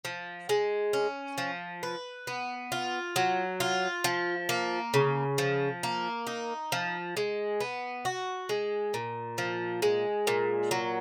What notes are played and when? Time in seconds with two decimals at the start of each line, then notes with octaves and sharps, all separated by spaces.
0.05 F3
0.49 G#3
0.93 C#4
1.38 F3
1.83 B4
2.27 B3
2.72 F4
3.16 F#3
3.60 F4
4.04 F3
4.49 A#3
4.94 C#3
5.38 F3
5.83 A#3
6.27 D#4
6.72 F3
7.17 G#3
7.60 B3
8.05 F#4
8.49 G#3
8.94 A#2
9.38 F3
9.82 G#3
10.27 A#2
10.71 F#3